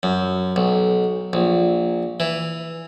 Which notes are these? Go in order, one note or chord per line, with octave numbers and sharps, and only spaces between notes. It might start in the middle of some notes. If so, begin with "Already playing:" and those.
F#2
B1
A#1
E3